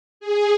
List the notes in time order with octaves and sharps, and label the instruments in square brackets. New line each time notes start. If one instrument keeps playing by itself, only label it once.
[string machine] G#4